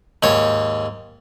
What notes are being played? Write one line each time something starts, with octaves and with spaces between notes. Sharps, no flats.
D#2 G#2 C#5